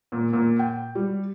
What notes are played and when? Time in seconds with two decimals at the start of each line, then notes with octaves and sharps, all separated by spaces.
0.12 A#2
0.33 A#2
0.59 G5
0.95 G3